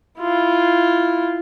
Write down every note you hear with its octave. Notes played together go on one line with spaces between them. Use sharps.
E4 F4